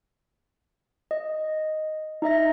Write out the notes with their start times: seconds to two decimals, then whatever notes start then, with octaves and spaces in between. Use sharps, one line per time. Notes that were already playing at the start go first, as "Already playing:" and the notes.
1.11 D#5
2.22 D#4 D#5 E5 A#6